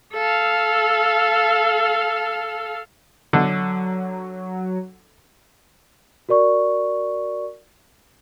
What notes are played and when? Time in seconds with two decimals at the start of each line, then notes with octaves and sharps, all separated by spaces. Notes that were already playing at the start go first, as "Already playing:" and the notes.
0.13 A4 F5
3.33 D3 F#3
6.29 F#4 A#4 D5 C#6